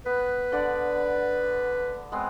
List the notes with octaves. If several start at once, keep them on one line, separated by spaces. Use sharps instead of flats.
B3 B4
D3 D5 F#5
G#3 B3 C4